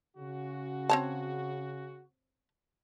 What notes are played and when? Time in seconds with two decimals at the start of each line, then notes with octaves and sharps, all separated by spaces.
0.17 C#3 F#4
0.89 C4 C#5 A5